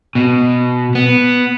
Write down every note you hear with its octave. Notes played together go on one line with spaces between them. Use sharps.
B2
B3